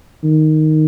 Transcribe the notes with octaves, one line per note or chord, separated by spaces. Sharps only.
D#3